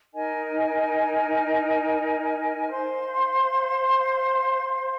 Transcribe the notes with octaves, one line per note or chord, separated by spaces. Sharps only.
D#4 A#4 D#5 G#5
C5 F5 C6